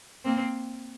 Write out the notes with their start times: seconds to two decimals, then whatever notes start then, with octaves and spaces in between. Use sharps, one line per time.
0.24 A#3 C4